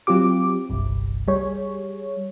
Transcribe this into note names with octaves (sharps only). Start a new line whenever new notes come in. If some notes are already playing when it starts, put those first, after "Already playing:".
F#3 C4 F4 G4 D6
G1 C2 G2
G3 G#4 C#5